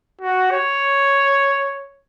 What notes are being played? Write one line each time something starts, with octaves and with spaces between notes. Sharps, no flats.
F#4
C#5